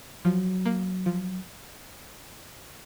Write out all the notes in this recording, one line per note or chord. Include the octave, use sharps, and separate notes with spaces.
F3 F#3
A#3
F3